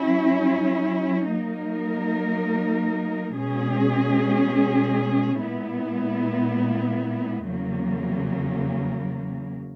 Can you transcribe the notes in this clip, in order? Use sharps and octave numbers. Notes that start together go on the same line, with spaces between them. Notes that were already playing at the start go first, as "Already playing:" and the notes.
Already playing: F#3 C#4 E4
F#3 A#3 D#4 A#4
B2 G#3 C#4 G#4
A#2 G#3 B3 E4
E2 C#3 F#3 A#3